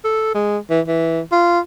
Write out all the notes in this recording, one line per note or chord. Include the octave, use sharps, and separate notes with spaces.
A4
G#3
E3
E3
F4